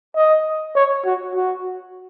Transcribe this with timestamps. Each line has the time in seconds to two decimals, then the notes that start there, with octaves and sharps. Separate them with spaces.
0.16 D#5
0.75 C#5
1.05 F#4
1.35 F#4